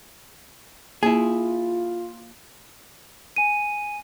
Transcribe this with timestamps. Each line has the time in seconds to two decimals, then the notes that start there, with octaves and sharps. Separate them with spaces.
1.03 A#3 E4 F4 G#4
3.36 G#5 D#7